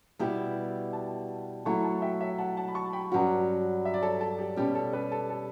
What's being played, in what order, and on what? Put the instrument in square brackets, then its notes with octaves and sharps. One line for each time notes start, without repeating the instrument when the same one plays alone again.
[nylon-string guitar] B2 G3 B3 E4 G4 [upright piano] E5 G5
[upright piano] F#5 A5
[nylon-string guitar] F#3 A3 E4 [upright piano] A5 C#6
[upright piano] A5 C#6
E5 G5
C#5 E5
F#5 A5
F#5 A5
B5
A5 C#6
G5 B5
[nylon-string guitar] G2 F#3 C#4 F#4
[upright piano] E5
D5
A4 C#5
A4
G4
[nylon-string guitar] B2 G3 C#4 [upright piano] G4
[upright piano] A4
G4 B4
A4
A4